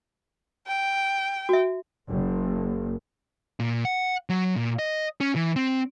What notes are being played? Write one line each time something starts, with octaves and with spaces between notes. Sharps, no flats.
G5
F#4 E5
F#1
A#2
F#5
F#3
A#2
D#5
C#4
E3
C4